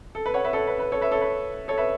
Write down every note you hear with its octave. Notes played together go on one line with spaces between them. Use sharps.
A4
B4
C#5 F#5
B4 E5
A4 C#5
B4
B4
A4 C#5
B4 E5
A4 C#5
B4
A4 C#5
B4 E5